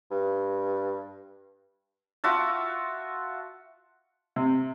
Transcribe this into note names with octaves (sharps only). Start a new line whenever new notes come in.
G2
F4 F#4 E5 A5
C3